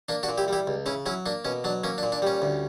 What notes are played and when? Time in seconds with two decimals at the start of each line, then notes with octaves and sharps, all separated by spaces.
0.09 A#3 D4
0.23 D4 F#4
0.29 A#2
0.38 E4 G4
0.48 G3 E4 G4
0.67 C#2
0.86 C#3 C#4 E4
1.06 F#3 C#4 E4
1.26 A#3 D4
1.45 B2 C#4
1.64 F#3 D4
1.84 A#3 C#4
1.98 D4
2.03 A#2
2.12 D4
2.22 G3 C#4
2.42 D2